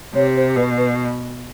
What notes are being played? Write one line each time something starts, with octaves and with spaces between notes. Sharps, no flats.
C3 C#5
C5
B2 B4
B4